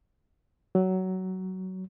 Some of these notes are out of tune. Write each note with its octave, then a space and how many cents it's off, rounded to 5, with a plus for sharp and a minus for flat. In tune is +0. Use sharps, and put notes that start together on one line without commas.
F#3 +15